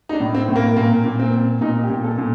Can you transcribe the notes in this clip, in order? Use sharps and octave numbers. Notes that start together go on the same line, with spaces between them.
D#4
D4
A2
C4
A2
A#3
A#2 A#3
A#2
C4
A#2
A#2 D#4
G4
A#2
A4
A#2